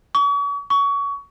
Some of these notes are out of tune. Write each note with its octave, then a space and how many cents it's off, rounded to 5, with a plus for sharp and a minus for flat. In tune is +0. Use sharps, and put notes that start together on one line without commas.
C#6 +40
C#6 +25